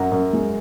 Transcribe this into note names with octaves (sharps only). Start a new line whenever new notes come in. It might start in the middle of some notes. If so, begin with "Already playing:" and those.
Already playing: F#2 F#5 A#5
F#2
G#3